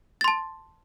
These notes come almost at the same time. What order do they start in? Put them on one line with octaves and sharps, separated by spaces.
A6 C6 A5